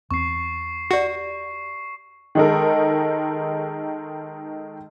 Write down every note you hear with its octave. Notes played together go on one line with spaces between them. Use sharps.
E2 C4 C#6 C7
F#4 G4 D5
D#3 G#3 D#4 A4 A#4